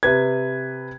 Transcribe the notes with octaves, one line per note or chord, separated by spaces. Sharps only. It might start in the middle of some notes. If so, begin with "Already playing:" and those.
C3 B4 G#6